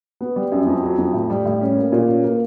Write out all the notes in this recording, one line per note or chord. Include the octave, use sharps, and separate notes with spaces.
B3
G3
F#2
F2
F#3
F2
A2
G3
A2
C#4
A#3
A#2
C#4
A#3